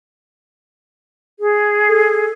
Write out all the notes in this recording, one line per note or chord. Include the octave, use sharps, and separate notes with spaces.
G#4
A4